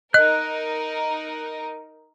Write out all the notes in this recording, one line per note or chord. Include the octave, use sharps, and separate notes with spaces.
D#4 A#4 D#5 F#6